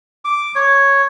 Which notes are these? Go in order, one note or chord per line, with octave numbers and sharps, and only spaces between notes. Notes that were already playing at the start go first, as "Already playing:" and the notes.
D6
C#5